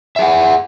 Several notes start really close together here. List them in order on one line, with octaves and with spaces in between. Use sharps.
E5 G#4 F#5